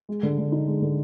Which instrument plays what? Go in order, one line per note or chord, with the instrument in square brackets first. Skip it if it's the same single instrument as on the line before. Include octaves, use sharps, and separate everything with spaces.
[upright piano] G#3
D3
D3
D#4
G#3
D3